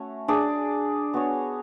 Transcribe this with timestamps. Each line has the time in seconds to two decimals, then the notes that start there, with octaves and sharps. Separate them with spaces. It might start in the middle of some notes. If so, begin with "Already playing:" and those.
Already playing: A3 C#4 F#4 C#5
0.28 D4 G#4 D5
1.14 B3 F#4 C#5